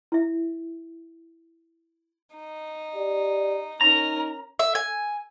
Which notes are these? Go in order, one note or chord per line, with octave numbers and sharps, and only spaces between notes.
E4 E5
D#4
G4 D5
C#4 D#4 A#4 A#5
E5
G#5